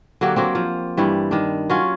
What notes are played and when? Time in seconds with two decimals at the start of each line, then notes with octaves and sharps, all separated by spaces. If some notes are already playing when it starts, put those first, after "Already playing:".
0.21 D3 F#3 A#3 G4
0.36 F#3 A#3 C4
0.55 F3
0.97 G2 E3 G3
1.31 D#3 D4
1.70 F#3 C#4 F4